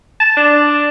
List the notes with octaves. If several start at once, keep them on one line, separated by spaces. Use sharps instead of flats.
A5
D4